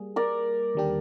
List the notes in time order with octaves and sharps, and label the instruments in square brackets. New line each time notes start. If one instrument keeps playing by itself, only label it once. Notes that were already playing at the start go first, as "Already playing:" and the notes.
Already playing: [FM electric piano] G3 A#3 G#4
[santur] A#4 D5
[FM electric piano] D#2 D3 G3 D4 G4